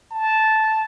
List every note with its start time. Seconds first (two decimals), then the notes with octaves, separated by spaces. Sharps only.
0.11 A5